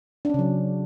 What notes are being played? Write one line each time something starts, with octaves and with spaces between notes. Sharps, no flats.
C#3 F#3 C#4 D4